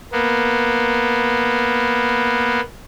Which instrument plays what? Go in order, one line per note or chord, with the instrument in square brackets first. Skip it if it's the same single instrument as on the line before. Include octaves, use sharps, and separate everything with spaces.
[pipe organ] A#3 B3